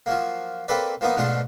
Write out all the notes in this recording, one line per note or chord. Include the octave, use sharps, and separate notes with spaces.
F3 F#3 A#3
A#3 C4 A4 B4 D5
F3 A#3 B3 D#4
G#2 B2 F3 A3 D4 F4